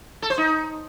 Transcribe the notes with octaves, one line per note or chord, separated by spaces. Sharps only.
A4
C5
D#4